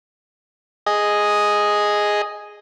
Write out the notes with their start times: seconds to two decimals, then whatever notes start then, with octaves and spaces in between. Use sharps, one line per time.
0.86 G#4 D#5